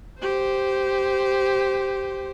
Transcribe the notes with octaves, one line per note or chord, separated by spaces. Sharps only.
G4 C5